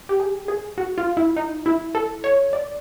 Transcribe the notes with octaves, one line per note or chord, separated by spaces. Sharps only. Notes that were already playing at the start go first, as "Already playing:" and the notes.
G4
G#4
G#4
F#4
F4
E4
D#4
E4
A4
C#5
D5